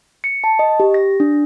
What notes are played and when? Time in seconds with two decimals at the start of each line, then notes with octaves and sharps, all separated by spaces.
0.24 C#7
0.44 A5
0.59 D#5
0.80 G4
0.94 A#6
1.20 D4